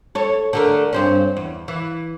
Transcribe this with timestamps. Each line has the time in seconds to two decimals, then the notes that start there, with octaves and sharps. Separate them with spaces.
0.15 A4 C#5
0.53 D3 A3 A#4
0.93 G2 C4 C#4
1.37 E2
1.68 E3